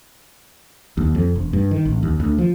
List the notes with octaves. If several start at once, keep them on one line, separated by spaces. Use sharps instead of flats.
D#2
F2
E1
G2
D#3
A1
D#2
D2
F3